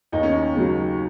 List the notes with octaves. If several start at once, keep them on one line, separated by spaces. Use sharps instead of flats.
D#2 D#4
C#4
D#4
C#3 F#3